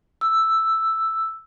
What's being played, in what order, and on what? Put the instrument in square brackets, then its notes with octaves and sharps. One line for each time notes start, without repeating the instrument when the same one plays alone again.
[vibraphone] E6